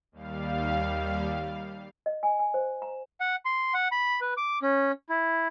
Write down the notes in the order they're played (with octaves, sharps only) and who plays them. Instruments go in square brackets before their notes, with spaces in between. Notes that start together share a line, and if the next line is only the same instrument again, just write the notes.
[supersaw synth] D#2 G3 F5
[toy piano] D#5
G#5
G#5
C5
A#5
[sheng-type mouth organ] F#5
C6
F#5
B5
B4
D6
C#4
E4